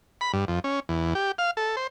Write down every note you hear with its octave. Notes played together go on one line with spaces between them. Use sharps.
B5
G2
F2
C#4
E2
G4
F5
A4
C5